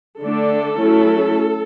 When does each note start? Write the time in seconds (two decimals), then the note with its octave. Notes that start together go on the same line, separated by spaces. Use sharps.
0.22 D3 A3 D4 A4
0.78 F#3 A3 C#4 E4